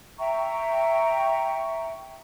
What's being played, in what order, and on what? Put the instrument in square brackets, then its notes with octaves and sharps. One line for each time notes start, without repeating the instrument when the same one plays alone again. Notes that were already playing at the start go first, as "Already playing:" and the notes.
[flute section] E5 G5 A#5 C#6